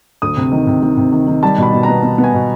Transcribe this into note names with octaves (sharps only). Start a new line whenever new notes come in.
D2 D#6
C3
D#3
C3
D#3
C3
D#3
D#3
G3 A5
B2 B5
B2
A#5
B3
B3
B3
G#5
B2